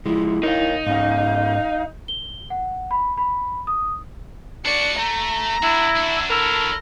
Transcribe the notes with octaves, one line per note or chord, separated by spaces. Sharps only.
F3 G#3 E4
D#4 A#4 C#5 F5
G#2 C#4 F5
G7
F#5
B5
B5
D#6
D4 F#4 D5 C#7
A3 A#5
D4 E4 F#4
D4 F#4
E4 A4 A#4